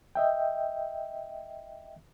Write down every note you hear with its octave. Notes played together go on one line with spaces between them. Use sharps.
D#5 E5 G5